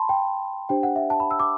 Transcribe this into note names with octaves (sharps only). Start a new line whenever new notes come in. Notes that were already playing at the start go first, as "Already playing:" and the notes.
Already playing: A5 B5 C6
G5
D4 G4 C5 G5
F#5
E5
A5
B5
E6
D6